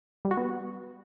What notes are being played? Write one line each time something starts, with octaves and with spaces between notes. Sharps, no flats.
G3
F#4
B3